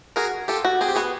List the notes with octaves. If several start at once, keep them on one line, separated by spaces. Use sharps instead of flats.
F#4 G#4 A#4
F4 G4 A4
F#4
C4 G#4
G4
B3 F#4 G#4